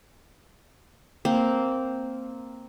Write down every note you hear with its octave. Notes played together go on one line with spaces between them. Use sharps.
A#3 C4